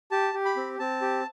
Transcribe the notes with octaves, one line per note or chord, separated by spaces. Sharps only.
G4 A5
G4
B5
C4
C4 A5
G4